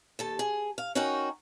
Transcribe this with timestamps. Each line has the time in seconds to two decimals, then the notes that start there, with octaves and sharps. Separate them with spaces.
0.19 D#2 A4 A5
0.39 G#4
0.78 F5
0.95 C#4 D#4 F#4 A#4 F#5 G5